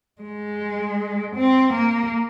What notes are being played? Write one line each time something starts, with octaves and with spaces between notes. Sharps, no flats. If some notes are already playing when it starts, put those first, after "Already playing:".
G#3
C4
A#3